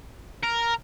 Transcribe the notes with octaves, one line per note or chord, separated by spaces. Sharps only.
A#4